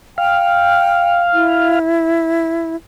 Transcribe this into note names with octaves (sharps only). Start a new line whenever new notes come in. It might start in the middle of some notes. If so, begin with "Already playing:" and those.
F5 G5
E4